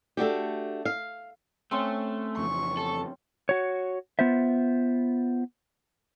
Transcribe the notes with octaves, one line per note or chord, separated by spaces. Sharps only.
A3 D4 F#4 G4
F5
A3 C4 C#4 C6
F2 C#3 E3 C#6
A4
F#4 C#5
B3 F4 C5 E5